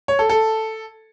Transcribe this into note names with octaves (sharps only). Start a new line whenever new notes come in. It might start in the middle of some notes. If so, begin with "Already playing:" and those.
C#5
A4
A4